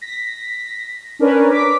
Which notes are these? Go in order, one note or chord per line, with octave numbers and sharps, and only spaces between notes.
A#6 B6
C#4 D4 A#4 B4 C#5
D6 B6